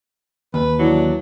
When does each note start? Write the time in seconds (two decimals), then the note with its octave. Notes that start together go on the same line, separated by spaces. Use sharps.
0.54 D#2 B4
0.79 E3 F#3 D4